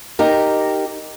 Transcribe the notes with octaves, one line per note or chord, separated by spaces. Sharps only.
D#4 G4 A#4